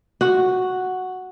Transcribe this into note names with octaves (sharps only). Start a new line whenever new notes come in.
F#4